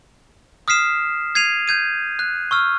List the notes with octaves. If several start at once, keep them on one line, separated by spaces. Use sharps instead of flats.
D#6 F6 B6 C7 E7
G#6 C7 D#7 F7
G6 G#6 D#7
F#6
C#6 E6 F6